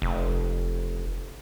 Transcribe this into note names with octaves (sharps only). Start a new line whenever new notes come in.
F1